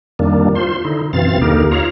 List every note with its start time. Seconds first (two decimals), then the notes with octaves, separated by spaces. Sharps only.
0.19 F2 D#3 G3 A#3 D4
0.55 F4 C5 C6
0.85 D3 D#4 E4
1.13 F#2 B2 E3 C4 F5 A6
1.41 D#2 D3 A#3 D#4 G4 A#4
1.71 D#4 F4 C#5 F5 A#5